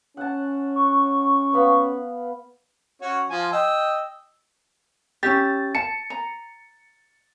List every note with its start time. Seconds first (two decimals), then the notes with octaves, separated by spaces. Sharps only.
0.17 C#4 F#5 A5
0.76 C#6
1.53 B3 F5 B5
3.02 C#4 F#4 C#5
3.30 F3 G#5
3.52 D#5 G5 E6
5.23 C#4 E4 G4 A6
5.75 A5 C#7
6.10 A#5